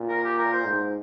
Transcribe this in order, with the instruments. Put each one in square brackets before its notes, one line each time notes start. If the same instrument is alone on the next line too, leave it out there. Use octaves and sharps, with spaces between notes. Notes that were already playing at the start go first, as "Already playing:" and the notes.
Already playing: [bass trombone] A#2
[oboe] A#4
G4
A#4
C5
[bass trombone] G#2